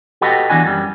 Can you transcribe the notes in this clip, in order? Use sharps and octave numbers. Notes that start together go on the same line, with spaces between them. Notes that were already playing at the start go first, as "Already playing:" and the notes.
F#4 G4 A4 B4 D#5 F#5
E2 E3 D4 F#4 G#5
F#2 G3